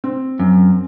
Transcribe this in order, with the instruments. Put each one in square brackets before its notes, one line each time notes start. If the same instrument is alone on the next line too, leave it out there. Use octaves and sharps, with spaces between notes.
[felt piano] C4
[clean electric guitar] F#2